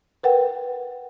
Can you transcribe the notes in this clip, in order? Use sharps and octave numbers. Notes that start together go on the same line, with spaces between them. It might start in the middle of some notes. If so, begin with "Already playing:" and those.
A#4 B4 F#5 G5